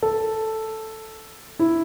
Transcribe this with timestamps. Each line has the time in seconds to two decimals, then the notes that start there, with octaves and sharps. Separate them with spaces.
0.03 A4
1.59 E4